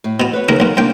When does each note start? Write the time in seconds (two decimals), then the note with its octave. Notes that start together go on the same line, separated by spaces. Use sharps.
0.04 A2
0.20 B2 B3
0.33 B4 C#5
0.49 D#2 C#3 A#4
0.60 B1 A#2
0.77 C2 A#3 D4 G5